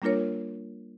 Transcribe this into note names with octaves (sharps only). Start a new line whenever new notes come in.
G3 A#3 D4 F4 A#4 C#5